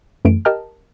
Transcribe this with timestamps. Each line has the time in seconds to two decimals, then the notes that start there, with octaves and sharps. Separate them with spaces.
0.25 F#2 E3 A3 D7
0.45 G4 A#4 D#5 G5 A5 F6